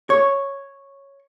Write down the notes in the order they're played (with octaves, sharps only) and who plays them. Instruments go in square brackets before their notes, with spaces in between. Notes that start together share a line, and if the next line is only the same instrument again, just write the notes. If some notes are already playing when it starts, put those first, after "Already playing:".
[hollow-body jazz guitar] C#5